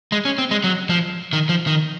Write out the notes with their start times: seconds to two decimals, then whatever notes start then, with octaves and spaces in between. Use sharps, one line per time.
0.12 G#3
0.25 C#4
0.38 C4
0.51 G#3
0.64 F#3
0.90 F3
1.33 D#3
1.49 F3
1.67 D#3